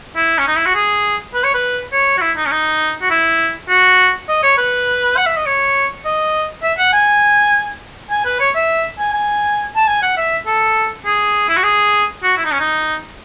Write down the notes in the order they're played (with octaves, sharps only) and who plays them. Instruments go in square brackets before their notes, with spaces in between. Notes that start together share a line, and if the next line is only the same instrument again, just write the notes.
[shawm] E4
C#4
D#4
E4
F#4
G#4
B4
C#5
B4
C#5
F#4
E4
D#4
C#4
D#4
F#4
E4
F#4
D#5
C#5
B4
F#5
E5
D#5
C#5
D#5
E5
F#5
G#5
G#5
B4
C#5
E5
G#5
G#5
A5
G#5
F#5
E5
A4
G#4
E4
F#4
G#4
F#4
E4
D#4
C#4
D#4